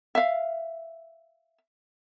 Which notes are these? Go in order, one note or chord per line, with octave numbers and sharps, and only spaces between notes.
E5 F5